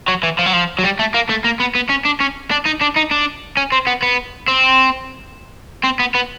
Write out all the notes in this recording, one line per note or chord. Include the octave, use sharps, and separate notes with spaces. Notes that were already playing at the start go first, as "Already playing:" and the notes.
F#3
E3
F3
F#3
F3
F#3
G3
A3
A#3
A3
A#3
B3
B3
C#4
D4
C#4
D4
D#4
D4
D#4
D4
C#4
C4
B3
B3
C4
C4
B3
B3